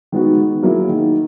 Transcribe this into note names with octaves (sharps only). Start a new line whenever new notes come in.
D#3 G#3 B3 F#4
D#3
F#3 A#3 E4 G#4
D#3